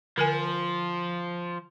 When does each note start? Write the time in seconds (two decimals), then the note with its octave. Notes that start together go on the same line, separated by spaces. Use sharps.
0.18 D3 F3 A#4 G#5